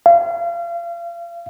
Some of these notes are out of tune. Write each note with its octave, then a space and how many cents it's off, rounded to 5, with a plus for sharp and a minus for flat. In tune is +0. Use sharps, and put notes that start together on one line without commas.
F5 -35